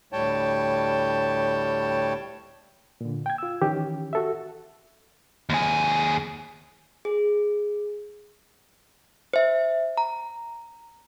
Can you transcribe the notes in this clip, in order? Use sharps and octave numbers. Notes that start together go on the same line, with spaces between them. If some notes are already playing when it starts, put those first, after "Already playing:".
D2 A2 G3 C#5 G5 A5
A#2 D3
G5 G#6
F4 E6
D#3 E3 C#4 G4
F#4 A4 E5
D#2 G#4
G#4
C5 E5
A#5